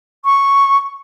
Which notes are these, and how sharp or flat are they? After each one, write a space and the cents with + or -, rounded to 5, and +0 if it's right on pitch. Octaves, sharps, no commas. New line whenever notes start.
C#6 -5